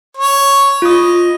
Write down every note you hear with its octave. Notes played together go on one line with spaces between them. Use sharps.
C#5
F4 D#5 D#6